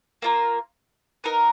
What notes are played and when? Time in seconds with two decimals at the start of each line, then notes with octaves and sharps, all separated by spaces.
0.22 A#3 F4 A#4
1.24 B3 D#4 A#4